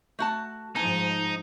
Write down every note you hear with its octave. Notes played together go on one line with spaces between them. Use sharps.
A3 F#4 A5
G#2 F3 D#4 G#5 A5